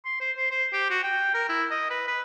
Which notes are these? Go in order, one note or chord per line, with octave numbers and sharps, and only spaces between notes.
C6
C5
C5
C5
G4
F#4
G5
A#4
E4
D#5
B4
B4